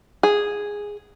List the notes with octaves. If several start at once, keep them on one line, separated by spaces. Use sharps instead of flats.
G#4